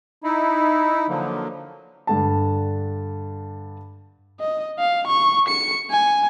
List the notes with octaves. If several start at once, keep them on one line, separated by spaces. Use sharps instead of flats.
D#4 E4
D3 F3 F#3 A#3
G2 D3 A5
D#5
F5
C#6
C#7
G#5